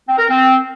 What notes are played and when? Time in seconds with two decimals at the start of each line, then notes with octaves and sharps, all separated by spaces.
0.07 C4
0.18 A#4
0.29 C4